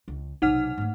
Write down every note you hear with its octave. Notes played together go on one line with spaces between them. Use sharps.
C#2
B1 C3 D#4 F#5 F6
G#2 A3